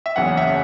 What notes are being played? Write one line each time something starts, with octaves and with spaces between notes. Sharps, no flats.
E5
F#1 E2 C#3 F#5
E5